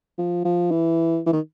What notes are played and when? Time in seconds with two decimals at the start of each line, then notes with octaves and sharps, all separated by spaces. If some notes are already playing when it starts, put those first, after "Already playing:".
0.18 F3
0.44 F3
0.71 E3
1.26 E3
1.33 D#3